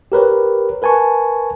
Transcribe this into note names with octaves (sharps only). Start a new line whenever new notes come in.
G4 A#4 B4 C#5
A#4 B4 G#5 A5 C#6